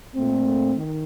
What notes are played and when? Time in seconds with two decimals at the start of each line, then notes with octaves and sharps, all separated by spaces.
0.15 A#2 A3 C4
0.76 D#3